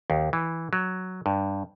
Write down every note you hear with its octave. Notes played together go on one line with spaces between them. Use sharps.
D#2
E3
F#3
G2